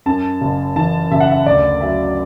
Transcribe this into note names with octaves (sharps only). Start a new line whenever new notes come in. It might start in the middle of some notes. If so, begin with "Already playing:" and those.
F#2 A5
F#1
E3 A5
F#1 E5
F#5
E5
D2 D5
F#3 E5